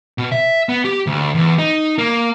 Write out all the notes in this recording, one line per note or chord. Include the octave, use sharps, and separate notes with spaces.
B2
E5
B3
G4
D2
E2
D#4
A#3